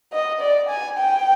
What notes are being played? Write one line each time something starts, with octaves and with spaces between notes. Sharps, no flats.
D#5
D5
G#5
G5